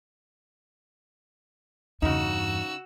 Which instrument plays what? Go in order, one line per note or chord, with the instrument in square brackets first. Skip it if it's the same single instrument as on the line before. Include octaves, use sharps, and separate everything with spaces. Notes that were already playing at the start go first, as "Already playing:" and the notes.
[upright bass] E2 G2 [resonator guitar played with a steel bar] C#3 D#4 [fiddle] F#4 E6